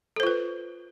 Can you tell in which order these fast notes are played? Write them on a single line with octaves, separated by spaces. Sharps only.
A4 C5 F4 B4